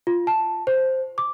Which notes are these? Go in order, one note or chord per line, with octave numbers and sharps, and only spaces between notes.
F4
A5
C5
D6